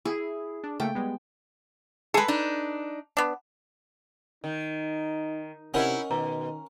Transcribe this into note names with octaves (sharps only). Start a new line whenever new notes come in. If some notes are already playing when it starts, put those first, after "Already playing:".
E4 G#4
D4
C#3 A3 A#3 G5
G3 G#3 B3
G#3 G#4 A4 B4
D4 D#4
B3 D4
D#3 D#4
C3 C#4 D#4 E4 F#4 A#4 D#5 F#5
B2 D#3 A#5